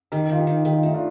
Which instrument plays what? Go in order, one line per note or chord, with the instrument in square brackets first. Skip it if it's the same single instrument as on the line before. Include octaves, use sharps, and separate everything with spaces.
[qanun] D#3 [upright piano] G4 A#4
[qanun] D#3 [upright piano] F4
[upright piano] D#4 G4
[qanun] D#3
[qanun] D#3 [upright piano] G4
[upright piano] F4
[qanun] A3 [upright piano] D#4
[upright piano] D4 F4